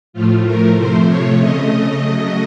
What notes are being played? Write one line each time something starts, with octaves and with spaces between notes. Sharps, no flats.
A2 F3 A3 F4
A#4
C3 F3 A3 C5
C#5
C#3 A3 D#5
C#3 F#3 A3